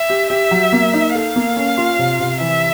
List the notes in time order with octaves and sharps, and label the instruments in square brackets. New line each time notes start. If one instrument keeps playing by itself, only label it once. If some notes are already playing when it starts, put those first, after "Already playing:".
Already playing: [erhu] E5
[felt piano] G4
[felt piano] G4 [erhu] E5
[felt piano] F#3
A#3
D#4
[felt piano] A4 [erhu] F5
[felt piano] A#3
C#4
F4
C3
C3
[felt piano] E3 [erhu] E5